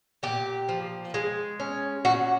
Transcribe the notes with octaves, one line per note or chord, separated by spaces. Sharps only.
A#2 G4
F3
G#3
C#4
A#2 F#4